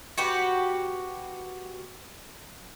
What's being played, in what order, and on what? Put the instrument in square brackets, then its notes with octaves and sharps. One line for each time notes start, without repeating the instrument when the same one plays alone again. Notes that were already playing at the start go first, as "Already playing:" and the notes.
[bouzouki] F#4 G4 B4